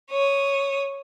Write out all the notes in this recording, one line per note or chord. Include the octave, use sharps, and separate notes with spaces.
C#5 D#6